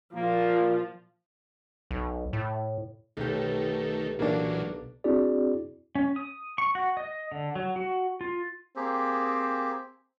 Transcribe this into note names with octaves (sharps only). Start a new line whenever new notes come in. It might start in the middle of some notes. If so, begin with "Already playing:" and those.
A#2 F3 A#3 F4
B1
A2
B1 D#3 A3 G4
A#2 E3 F#3 A#3 D4
C4 D4 E4 F#4 G#4 D5
C#4
D#6
C#6
F#4
D#5
D3
F#3
F#4
F4
A#3 C4 G4 G#4